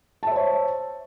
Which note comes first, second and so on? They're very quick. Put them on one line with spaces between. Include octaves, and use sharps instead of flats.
A5 E5 C5 C#5